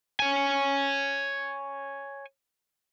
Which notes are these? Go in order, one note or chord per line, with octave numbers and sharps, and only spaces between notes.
C#5 G#5